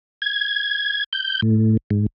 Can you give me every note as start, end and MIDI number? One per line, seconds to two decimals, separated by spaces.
0.22 1.04 92
1.13 1.41 91
1.42 1.77 45
1.90 2.06 44